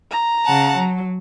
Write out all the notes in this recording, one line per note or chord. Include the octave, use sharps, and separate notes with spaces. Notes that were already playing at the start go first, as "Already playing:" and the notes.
A#5
C#3 F#5 A5
F#3